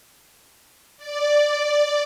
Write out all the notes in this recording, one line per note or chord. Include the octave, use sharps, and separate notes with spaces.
D5